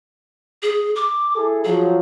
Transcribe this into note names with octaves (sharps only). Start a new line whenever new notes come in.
G#4
D6
E4 G#4 A4
F3 F#3 G#4